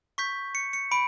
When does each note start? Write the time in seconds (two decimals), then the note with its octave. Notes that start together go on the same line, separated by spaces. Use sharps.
0.18 C#6 G6 B6
0.55 C#7
0.73 C#7
0.91 B5 D7